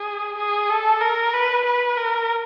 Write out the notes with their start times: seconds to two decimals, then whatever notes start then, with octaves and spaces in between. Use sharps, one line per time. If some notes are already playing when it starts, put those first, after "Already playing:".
Already playing: G#4
0.37 G#4
0.69 A4
1.01 A#4
1.33 B4
1.65 B4
1.97 A#4